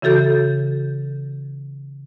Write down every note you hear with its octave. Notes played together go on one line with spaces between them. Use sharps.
C#3 E3 F#4 A4 G6